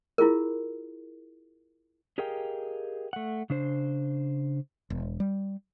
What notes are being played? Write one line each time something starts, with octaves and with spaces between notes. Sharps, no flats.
E4 F4 G#4 A#4
G4 G#4 A#4 D#5 F5 G5
A3 F#5
C#3 D4 C5
E1
G3